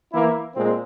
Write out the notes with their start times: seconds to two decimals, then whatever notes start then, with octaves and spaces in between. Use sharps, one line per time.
0.12 E3 A#3 E4
0.55 A#2 G#3 C4